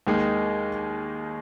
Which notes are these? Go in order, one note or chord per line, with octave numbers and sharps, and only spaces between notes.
D#2 D#3 G#3 D#4